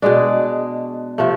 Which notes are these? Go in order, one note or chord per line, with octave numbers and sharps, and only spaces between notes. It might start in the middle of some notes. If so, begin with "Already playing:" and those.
B2 G#3 D4
C3 F3 A3